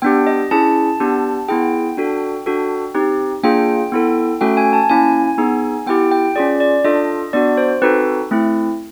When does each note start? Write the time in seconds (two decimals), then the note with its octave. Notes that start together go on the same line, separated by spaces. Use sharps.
0.02 B3 D4 G4 G5
0.27 D#5
0.51 C#4 E4 G#4 A5
1.00 B3 D4 G4
1.48 B3 E4 G#4 G5
1.97 D4 F#4 A4
2.46 D4 F#4 A4
2.95 C4 D#4 G4
3.43 A#3 D4 F4 G#4 G5
3.92 B3 E4 A4
4.41 A3 C#4 F#4 A4 G5
4.57 G#5
4.73 A5
4.89 A#3 C#4 E4 G#5
5.38 B3 D#4 G#4
5.86 B3 E4 G4 G5
6.11 G5
6.36 C#4 F4 G#4 D5
6.60 D5
6.84 D4 F4 A4 D#5
7.33 B3 D4 F#4 D5
7.57 C5
7.82 C4 D#4 F#4 A4 B4
8.31 A3 C4 E4